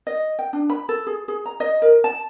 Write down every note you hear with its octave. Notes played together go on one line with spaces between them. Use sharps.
D#5
G5
D4
B5
A4
G#4
G#4
A#5
D#5
A#4
A5